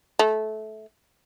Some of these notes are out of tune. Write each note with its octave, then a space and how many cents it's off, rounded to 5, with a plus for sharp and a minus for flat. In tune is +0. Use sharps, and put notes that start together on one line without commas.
A3 -20